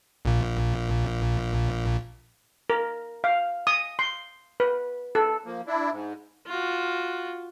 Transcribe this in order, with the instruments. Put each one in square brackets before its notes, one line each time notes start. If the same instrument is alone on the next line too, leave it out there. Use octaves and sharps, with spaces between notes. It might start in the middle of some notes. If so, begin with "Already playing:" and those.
[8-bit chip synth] A#1 A#2
[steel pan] A#4
F5
D#6
C6
B4
A4
[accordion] F3 A#3
D4 E4
G#2
[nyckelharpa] F4 F#4